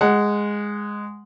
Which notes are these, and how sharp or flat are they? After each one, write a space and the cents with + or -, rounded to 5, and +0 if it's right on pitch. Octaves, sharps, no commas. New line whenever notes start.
G#3 -5 F#5 +0